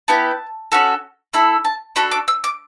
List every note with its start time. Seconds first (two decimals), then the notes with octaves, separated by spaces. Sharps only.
0.08 B3 E4 G4 A5
0.72 C#4 F#4 A4
1.33 A3 E4 A4 B5
1.65 A5
1.96 D4 F#4 A4 B5
2.11 D6
2.28 E6
2.44 D6